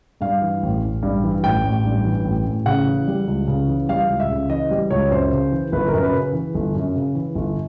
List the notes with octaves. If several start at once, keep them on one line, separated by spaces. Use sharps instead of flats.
G2 F5
E3
A1
A1
G2
E3
A1 G5
A1
G2
E3
A1
A1
C#3 F#5
E3
G3
C#2
C#3
E3
G3 F5
C#2
E5
C#3
E3 D#5
G3
C#2 C#5
F#2 C5
C#3
E3
G1 B4
A#4
F#2
B4
C#3
E3
G1
F#2
C#3
E3
G1